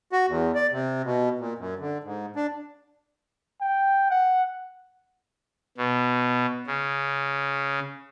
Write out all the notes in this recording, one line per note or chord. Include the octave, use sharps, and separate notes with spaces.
F#4
E2
D5
C3
B2
A#2
F#2
D3
G#2
D4
G5
F#5
B2
C#3